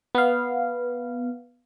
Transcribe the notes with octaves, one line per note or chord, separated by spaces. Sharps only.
B3 F5